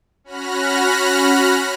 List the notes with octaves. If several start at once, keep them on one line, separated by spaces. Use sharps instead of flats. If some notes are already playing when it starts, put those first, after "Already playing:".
C#4 F#4 B5 F6 F#6 A#6